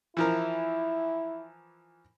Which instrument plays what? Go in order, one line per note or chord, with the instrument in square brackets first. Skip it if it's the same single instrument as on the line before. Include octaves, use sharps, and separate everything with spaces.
[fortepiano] E3 F3 A#4 [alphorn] E4